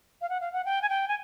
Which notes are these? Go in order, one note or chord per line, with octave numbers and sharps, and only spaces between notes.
F5
F#5
F5
F#5
G5
G#5
G5
G#5